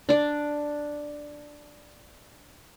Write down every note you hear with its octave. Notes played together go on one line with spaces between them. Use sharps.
D4 D5